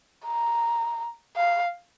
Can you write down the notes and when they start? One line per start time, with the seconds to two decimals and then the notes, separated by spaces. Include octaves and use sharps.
0.26 A#5
1.36 F5